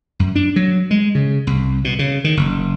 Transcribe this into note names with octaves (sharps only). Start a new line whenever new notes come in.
F#2
D4
F#3
G#3
C#3
C2
B2
C#3
D#3
F#1